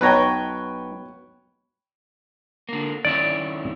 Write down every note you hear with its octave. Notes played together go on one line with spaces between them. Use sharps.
B1 B2 B4 C#5 G5 A#5
D3 A#3
D#3 C#4 E4 D5